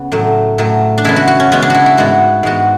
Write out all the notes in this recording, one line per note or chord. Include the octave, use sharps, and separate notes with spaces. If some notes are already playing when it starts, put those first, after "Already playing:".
Already playing: C#3 B3
A2 F#3 A3
A2 F#3 A3
D4
C#3 G#3 B3 E4
F#4
F#4
C#4
C#3 G#3 B3 C#4
D4
E4 F#4
E4
G#2 G#3 B3 F#4
G#2 G#3 B3 F#4